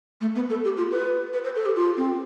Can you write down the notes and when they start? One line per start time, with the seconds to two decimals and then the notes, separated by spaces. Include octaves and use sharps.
0.21 A3
0.35 B3
0.50 A4
0.64 G4
0.77 F4
0.91 B4
1.33 B4
1.44 C5
1.55 A4
1.66 G4
1.76 F4
1.97 C4